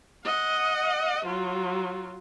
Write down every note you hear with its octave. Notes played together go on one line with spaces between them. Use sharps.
D#5 F#5
F#3 F4